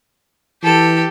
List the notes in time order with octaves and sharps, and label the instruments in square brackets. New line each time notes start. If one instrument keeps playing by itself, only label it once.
[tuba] E3 [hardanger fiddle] G4 A4